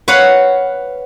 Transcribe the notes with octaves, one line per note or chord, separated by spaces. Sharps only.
B4 C#5 F5 F#5